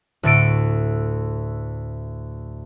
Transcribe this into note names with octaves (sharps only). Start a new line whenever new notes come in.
D2 A2 A4 C#7 D7